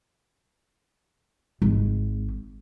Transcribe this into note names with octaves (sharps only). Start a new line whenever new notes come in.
G#1